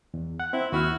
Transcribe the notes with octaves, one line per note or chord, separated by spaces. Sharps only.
E2
F#5
C4 E4
D#2 E4 F#4 F6